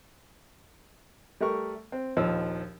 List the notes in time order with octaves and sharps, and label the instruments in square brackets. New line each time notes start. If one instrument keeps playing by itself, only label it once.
[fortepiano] G3 A3 A#4 C#6
C4
A#1 D#2 F3 D#4 E6